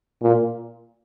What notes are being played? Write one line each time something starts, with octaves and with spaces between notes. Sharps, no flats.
A#2